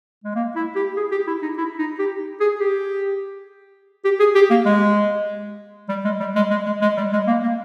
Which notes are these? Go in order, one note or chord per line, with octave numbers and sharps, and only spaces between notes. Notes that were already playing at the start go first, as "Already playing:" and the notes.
G#3
A#3
E4
G4
G#4
G4
E4
D#4
E4
D#4
G4
G#4
G4
G4
G#4
G4
A#3
G#3
G3
G#3
G3
G#3
G#3
G#3
G#3
G3
G#3
A#3
A#3